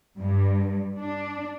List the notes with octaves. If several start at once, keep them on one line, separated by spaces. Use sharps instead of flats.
G2
D4